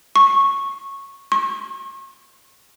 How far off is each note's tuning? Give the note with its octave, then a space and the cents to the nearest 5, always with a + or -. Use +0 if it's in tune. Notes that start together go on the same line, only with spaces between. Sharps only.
C#6 -10
C#6 -45